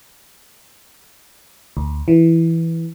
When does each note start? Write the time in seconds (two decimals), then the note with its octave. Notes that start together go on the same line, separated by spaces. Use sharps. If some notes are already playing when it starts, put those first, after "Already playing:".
1.77 D2
2.08 E3